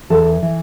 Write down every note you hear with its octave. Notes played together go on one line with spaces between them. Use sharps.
E2 E3 A4
E3